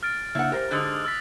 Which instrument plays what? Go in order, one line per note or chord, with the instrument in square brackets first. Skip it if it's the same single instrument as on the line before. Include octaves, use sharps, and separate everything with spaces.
[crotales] F6 A6 D7
[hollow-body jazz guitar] C#3 A#3 D4 [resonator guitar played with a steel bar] E4 F#5
[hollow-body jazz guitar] G4 C5 F5 [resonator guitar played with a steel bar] A#4
[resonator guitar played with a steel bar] G#2 D3 G#3 [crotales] D#6 E6 F#6
[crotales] E6 A6 B6